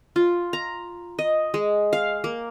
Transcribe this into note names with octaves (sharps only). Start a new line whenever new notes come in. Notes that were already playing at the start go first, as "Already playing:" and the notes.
F4
A#5
D#5
G#3
F5
A#3